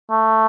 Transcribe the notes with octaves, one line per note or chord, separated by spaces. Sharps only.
A3